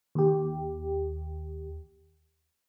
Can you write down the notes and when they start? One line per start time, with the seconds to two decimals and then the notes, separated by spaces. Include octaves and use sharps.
0.15 D#2 G4